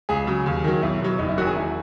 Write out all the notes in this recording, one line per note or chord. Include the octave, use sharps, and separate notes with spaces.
C#2 G#4
C#3 F#3
D#2
D#3 F#3
B1 E4
B2 F#3
F#1 D#4
E4
F#2 D#3 F#3 F#4
G#4
E1 E4